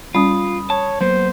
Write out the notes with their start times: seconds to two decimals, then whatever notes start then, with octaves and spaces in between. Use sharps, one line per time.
0.14 G3 C#4 F4 B5 D#6
0.70 C#5 A5
1.01 F#3 A#3 B3 C5